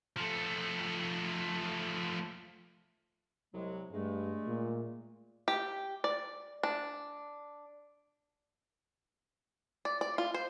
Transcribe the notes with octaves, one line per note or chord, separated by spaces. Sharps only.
F3 A3
C2 F#3 G#3
G2 G#3 A3
A#2
G4
D5
D4
D5
D5
F4
C5